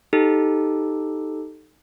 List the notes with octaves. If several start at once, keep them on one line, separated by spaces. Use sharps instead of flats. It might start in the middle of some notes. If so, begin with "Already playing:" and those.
D#4 G4 A4